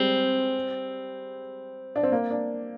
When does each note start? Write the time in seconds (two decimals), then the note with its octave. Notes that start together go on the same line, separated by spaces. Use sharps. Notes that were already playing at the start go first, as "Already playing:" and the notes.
Already playing: G3 G#3 C4
1.96 D4
2.03 C4
2.12 A#3
2.31 D4